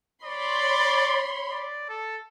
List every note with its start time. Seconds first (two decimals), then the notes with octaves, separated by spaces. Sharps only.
0.24 C#5 D5 B5 C6
1.52 D5
1.89 A4